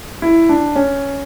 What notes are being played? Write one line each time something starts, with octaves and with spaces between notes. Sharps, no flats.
E4
D4
C#4